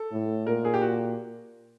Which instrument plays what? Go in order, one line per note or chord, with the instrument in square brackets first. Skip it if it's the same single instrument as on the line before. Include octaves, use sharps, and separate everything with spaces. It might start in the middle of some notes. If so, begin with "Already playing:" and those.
Already playing: [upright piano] A4
[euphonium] A2
[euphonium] A#2 [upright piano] A#4
[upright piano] G#4
G4
F#4